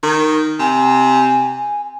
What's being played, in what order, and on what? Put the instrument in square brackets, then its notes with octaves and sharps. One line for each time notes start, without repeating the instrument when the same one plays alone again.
[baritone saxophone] D#3
[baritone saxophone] C3 [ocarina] G#5